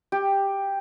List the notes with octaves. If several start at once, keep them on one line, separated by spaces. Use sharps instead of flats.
G4